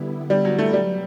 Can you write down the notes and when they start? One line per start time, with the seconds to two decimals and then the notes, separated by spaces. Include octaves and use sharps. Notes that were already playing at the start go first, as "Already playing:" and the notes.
Already playing: D3 G3 B3 E4
0.30 G3
0.45 F#3
0.58 A3
0.73 B2 F#3 G3